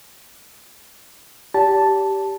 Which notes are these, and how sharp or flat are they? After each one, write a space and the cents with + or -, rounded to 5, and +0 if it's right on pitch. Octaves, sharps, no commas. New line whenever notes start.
G4 -5 D5 -35 A5 +0